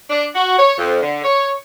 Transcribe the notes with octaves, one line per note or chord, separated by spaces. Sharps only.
D4
F#4
C#5
F2
D3
C#5